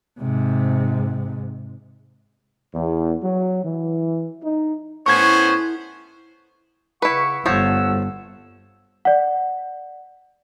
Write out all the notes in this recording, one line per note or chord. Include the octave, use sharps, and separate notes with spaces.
G#2 C3
E2
F#3
E3
D#4
A2 B3 C#4 C5 C#6 G#6
C#3 E4 B4 F#5 C#6
G1 F3 A3 C#5 F#5 E6
D5 F#5